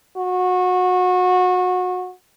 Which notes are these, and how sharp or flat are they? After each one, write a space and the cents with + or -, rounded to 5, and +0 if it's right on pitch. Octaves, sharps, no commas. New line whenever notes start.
F#4 -25